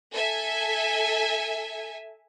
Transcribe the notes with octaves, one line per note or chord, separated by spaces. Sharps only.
A4 E5 G#5